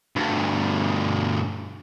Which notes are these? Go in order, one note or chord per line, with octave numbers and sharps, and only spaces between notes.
D2 G2